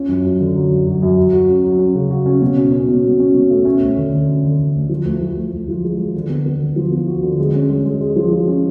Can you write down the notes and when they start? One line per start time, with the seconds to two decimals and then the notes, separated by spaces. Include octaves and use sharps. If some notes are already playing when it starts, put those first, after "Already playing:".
Already playing: C#4 F4
0.09 F#2
0.24 F#3
0.40 D3
0.55 F#3
0.71 F#2
0.87 F#3
1.02 F#2
1.18 F#3
1.33 F#4
1.49 C#4
1.64 F#3
1.79 C#4
1.95 C#3
2.10 F#4
2.26 C#4
2.42 B2
2.58 C#4
2.72 C#4
2.89 B2
3.04 B2
3.19 C#4
3.34 B2
3.50 A3
3.65 C#4
3.82 D2
3.97 D3
4.13 D3
4.28 C#4
4.44 D3
4.59 D3
4.74 D2
4.89 F3
5.05 D2
5.21 F3
5.37 D2
5.52 D2
5.68 F3
5.84 G#3
5.98 G#3
6.15 D3
6.29 B3
6.46 B3
6.60 D3
6.76 F3
6.92 B3
7.07 F#4
7.22 D3
7.39 G#3
7.54 C#4
7.69 G#3
7.85 G#3
8.01 G#3
8.16 F3
8.31 F3
8.48 C#4